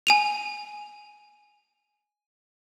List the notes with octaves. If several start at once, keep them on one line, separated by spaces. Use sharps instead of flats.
G#5 D#7 F7